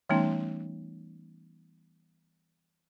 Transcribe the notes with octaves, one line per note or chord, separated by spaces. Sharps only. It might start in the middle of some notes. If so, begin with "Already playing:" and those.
E3 G3 A3 B3 C#4 D#4